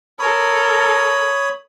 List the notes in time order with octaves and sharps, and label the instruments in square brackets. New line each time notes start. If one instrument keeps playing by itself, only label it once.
[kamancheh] A4 A#4 [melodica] C#5 B5 D#6